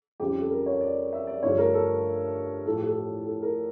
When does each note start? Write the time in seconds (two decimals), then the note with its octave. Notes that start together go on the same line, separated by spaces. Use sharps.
0.20 F2 C#3 G3 G4
0.30 F4
0.41 A4
0.51 A#4
0.66 C#5
0.81 D5
1.13 E5
1.27 D5
1.43 G2 D3 F3 A3 C#5
1.58 A#4
1.73 A4
2.66 A2 F3 A3 A4
2.77 G4
2.87 A4
3.27 A4
3.42 A#4